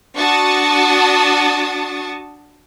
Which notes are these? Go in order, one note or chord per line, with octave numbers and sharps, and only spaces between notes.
D4 F#4 A5 C#6 D#6 A6